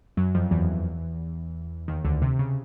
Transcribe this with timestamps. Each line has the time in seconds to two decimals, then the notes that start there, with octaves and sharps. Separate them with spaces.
0.17 F#2 F#3
0.35 F2 F3
0.51 E2 E3
1.88 D#2 D#3
2.05 D2 D3
2.22 C3
2.39 C#3